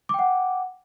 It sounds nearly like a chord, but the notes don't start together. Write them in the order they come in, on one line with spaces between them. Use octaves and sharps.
D6 G5 F#5